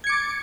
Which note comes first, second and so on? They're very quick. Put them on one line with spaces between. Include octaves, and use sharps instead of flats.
G#6 C#7 D6 A6